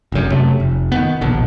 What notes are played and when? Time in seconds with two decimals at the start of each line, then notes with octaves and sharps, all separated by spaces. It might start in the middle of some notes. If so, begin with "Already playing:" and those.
0.12 F1 F#2
0.32 F#2 C3 F#3 A3
0.60 F1
0.92 D#3 B3
1.21 A#1 D#2 B2 D3